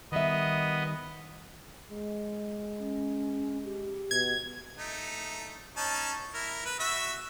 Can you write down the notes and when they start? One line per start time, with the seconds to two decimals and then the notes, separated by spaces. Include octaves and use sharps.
0.12 D#3 G3 B3 D#5 E5
1.91 G#3
2.79 C#4
3.65 G4
4.11 B2 G#6
4.77 A3 D#4
5.77 C#4 D#4 A5
6.34 E4 A#4
6.65 B4
6.80 F#4 E5 E6